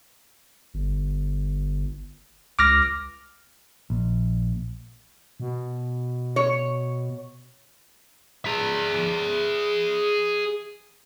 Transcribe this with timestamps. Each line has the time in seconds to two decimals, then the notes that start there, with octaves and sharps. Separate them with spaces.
0.74 G1
2.59 C#2 D6 F6 A#6
3.90 A#1
5.40 B2
6.36 C#5
8.45 G#4 E5